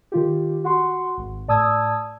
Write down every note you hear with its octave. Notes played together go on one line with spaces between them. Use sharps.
D#3 F4 G4
F#4 F#5 C6
G#1
A2 D5 A5 D#6 E6 G#6